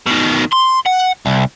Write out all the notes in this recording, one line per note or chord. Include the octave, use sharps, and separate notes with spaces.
B2 D#3
C6
F#5
C2